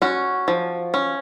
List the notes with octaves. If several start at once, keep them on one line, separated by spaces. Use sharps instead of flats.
C#4 F#4
F3
C#4